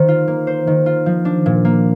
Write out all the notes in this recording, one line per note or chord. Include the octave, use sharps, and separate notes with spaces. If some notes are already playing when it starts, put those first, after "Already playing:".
Already playing: D#3 A#3 C5
F4
A#3
C5
D#3
F4
F3
D4
A#2
A#3